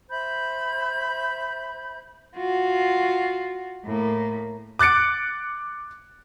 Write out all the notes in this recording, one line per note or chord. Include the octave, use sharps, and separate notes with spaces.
C5 E5 B5 G6
F4 F#4
A2 A#3
D6 F#6 A6 C#7 D7